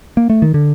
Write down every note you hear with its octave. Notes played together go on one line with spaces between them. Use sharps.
A#3
A3
D#3
D3